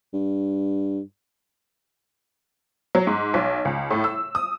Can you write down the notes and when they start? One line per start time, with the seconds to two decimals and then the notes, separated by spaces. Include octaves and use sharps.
0.13 G2
2.95 F#3
3.07 G#2
3.34 B1
3.65 C#2
3.91 A2
4.04 E6
4.35 D#6